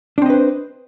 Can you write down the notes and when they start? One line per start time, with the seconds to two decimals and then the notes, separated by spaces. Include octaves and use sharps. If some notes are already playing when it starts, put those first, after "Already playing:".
0.18 D4
0.22 C4
0.26 D#5
0.30 B4
0.34 C5